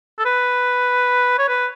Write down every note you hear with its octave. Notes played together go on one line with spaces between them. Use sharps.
A4
B4
C#5
B4